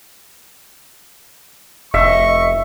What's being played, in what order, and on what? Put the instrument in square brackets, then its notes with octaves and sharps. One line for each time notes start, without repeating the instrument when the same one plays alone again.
[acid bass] F1 [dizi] D#5 [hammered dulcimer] E5 [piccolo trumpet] C#6